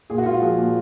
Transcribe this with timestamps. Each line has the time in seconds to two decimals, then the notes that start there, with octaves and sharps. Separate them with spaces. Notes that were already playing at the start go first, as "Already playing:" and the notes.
0.10 A#2 G#4
0.18 F#4
0.26 G#3 F4
0.34 F#4
0.42 F3 G#4
0.58 A#2